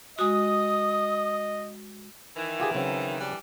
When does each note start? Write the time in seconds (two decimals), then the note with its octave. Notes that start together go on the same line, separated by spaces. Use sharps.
0.19 G#3 F#4 D#5 D#6
2.36 D#3 E3
2.60 F4 G4 G#4
2.75 C#3 F#3 C4
3.20 E3 G3 D4